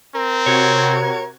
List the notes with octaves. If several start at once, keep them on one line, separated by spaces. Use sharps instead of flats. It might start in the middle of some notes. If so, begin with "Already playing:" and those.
C4 A#4
C3 F#4 C#5 G#6